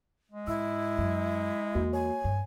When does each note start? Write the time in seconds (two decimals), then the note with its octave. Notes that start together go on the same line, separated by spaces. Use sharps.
0.32 G#3
0.47 G#2 E4 E6
0.98 F#2
1.75 E2 A#3 F#4
1.93 C#5 G#5
2.24 G2